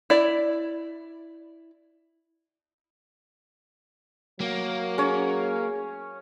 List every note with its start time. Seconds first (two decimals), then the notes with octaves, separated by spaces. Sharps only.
0.10 E4 D5
4.40 F#3 A#3
4.98 C#4 G#4 C#5